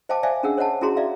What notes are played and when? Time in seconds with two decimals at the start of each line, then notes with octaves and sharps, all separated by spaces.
0.09 C5 D#5 F5 G5 A5 D6
0.23 C5 D5 E5 F5 G#5
0.43 C#4 D4 G#4 F#5 E6
0.57 C5 C#5 D#5 F#5 A5
0.81 C#4 E4 F#4 G#4 A#5 C6
0.97 D5 E5 F5